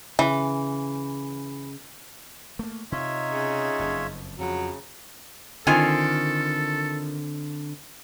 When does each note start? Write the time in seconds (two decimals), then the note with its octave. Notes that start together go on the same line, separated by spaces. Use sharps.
0.19 C#3 E3
2.59 A3 A#3
2.92 C3 D#4 F4 C#5 E5
3.28 C#3
3.80 F#1 F2
4.39 F2 C#3 F3 F#3
5.67 D3 D#3 C4 F4 A4 G#5